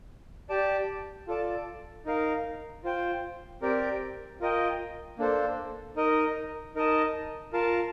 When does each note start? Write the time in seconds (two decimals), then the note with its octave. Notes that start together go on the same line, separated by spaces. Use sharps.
0.49 G4 D5 A5
1.28 F4 A4 D5 A5
2.05 D#4 A#4 F5
2.84 F4 C5 G5
3.62 C4 G4 A#4 D5
4.40 F4 A#4 D#5 G5
5.19 A#3 D4 A4 C5
5.96 D#4 A#4 D#5
6.75 D#4 A#4 D#5 A5
7.53 F4 A#4 F5 A5